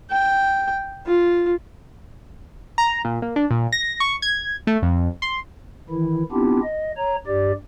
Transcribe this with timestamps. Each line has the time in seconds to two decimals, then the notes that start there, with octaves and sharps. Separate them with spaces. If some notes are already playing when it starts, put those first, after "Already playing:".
0.11 G5
1.06 F4
2.78 A#5
3.05 A#2
3.22 A#3
3.36 D4
3.51 A#2
3.72 A#6
4.00 C#6
4.22 G#6
4.67 A3
4.82 F2
5.22 C6
5.89 D#3 E3 E4
6.32 B3 C4 D4 E4 F4 G4
6.63 D#5
6.97 C#5 A#5
7.27 G2 G4 D5